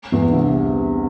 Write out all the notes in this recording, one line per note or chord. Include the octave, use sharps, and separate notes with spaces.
E2 E3
D3
C2 C3